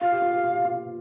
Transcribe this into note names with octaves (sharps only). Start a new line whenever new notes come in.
F4 F5
G4
F4
G4
F4
G4
F4